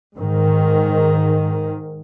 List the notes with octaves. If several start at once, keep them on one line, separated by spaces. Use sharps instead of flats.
G#2 D#3